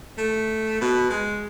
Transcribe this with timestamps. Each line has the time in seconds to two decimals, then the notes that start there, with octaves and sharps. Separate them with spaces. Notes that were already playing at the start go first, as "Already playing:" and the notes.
0.17 A3
0.81 B2
1.10 G#3